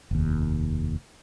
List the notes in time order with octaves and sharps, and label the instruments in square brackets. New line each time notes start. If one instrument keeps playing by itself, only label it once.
[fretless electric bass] F1 D#2